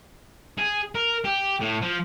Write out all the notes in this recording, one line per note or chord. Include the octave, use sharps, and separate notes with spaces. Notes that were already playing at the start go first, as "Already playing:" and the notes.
G#4
A#4
G4
A2
F3